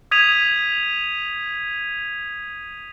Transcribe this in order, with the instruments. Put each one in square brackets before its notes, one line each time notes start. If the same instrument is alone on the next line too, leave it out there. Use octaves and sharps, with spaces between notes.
[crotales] D#6 G#6 B6 D#7 F7